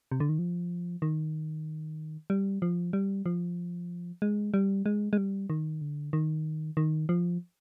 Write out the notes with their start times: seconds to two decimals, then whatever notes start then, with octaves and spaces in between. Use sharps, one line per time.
0.12 C3
0.20 D3
0.29 D#3
0.39 F3
1.02 D#3
2.30 G3
2.62 F3
2.93 G3
3.26 F3
4.22 G#3
4.54 G3
4.86 G#3
5.13 G#3
5.17 G3
5.50 D#3
5.81 D3
6.13 D#3
6.77 D#3
7.09 F3